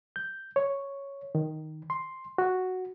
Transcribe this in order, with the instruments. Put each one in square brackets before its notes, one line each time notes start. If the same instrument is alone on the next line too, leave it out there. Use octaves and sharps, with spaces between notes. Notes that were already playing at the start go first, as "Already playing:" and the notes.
[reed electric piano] G6
C#5
D#3
C6
F#4